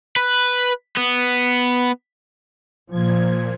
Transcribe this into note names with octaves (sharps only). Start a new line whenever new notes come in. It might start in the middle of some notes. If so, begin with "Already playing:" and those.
B4
B3
A#2 F3 G#6